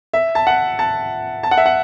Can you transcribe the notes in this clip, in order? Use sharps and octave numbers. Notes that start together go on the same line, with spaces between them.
E5
A5
F#5
A5
A5
F#5
E5
F#5